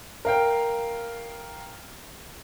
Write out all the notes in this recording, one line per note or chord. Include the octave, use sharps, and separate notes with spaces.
A#4 F5 G5